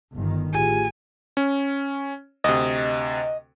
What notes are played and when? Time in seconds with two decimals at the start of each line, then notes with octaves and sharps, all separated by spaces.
0.12 G1 D#3
0.53 A1 F4 G4 G#4 G#5
1.37 C#4
2.44 D2 C3 D#5